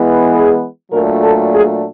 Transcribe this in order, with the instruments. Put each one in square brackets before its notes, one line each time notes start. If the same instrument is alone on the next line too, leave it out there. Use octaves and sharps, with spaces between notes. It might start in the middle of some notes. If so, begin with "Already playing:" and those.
Already playing: [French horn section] E3 G#3 B3
G#4
A#2 F#3 A3 D4 A#4
A4
G#4